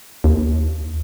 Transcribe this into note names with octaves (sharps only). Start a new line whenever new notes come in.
D#2